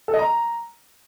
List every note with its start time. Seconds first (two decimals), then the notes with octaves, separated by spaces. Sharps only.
0.08 A4
0.14 D#5
0.19 A#5